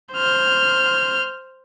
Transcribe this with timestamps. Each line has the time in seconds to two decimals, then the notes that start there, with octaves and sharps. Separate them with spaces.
0.14 C5 F6